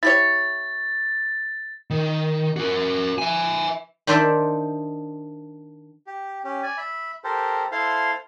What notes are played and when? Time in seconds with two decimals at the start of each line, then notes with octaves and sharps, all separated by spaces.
0.03 E4 G4 C#5 A6
1.90 D#3
2.56 F#4 A#4
3.18 E5 G#5
4.07 D#3 D4 D#4 C5 D5 E5
6.07 G4
6.44 C#4 G4
6.63 D5 G#5
6.78 E5 B5
7.24 G4 A4 A#4 C5
7.72 E4 A4 C5 F5 C6